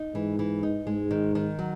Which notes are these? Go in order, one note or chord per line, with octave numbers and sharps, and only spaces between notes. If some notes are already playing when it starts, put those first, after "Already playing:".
Already playing: D#4
G#2 E3
E3
D#4
G#2 G#3
D#3
D#3
F#3